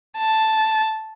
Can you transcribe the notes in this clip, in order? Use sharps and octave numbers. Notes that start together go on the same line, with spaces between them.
A5